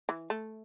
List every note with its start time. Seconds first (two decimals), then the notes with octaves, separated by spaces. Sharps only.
0.09 E3
0.30 A3